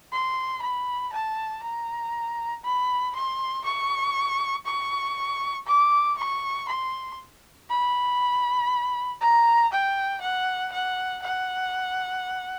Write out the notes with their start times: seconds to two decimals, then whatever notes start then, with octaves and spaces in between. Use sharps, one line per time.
0.12 C6
0.62 B5
1.13 A5
1.63 A#5
2.64 B5
3.15 C6
3.65 C#6
4.66 C#6
5.67 D6
6.18 C#6
6.68 C6
7.70 B5
9.21 A#5
9.72 G5
10.21 F#5
10.72 F#5
11.23 F#5